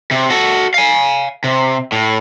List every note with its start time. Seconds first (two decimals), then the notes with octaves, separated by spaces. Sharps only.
0.11 C3
0.30 F#4 A4
0.74 F5 G#5
1.44 C3
1.92 A2